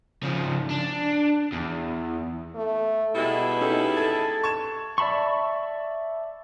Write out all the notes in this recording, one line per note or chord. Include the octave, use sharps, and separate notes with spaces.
C#3 F3
D4
E2
A3
B2 G3 G#3 E4
C#4 D#4 G4 A4
A4 A5 G#6
C#6 G#6 E7
D5 E5 A5 B5 C#6